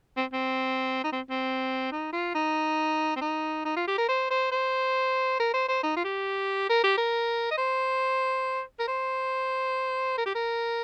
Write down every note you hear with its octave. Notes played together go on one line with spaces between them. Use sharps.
C4
C4
D#4
C4
C4
D#4
F4
D#4
C4
D#4
D#4
F4
G4
A#4
C5
C5
C5
A#4
C5
C5
D#4
F4
G4
A#4
G4
A#4
D#5
C5
A#4
C5
A#4
G4
A#4